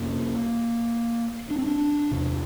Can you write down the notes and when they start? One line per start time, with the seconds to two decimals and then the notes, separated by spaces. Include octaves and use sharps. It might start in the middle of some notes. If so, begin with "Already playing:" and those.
Already playing: F2 C3 A#3
1.51 D4
1.58 C4
1.66 D4
2.11 E2 C3